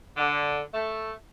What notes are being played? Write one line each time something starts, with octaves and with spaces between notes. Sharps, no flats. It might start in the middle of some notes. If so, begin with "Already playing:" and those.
D3
A3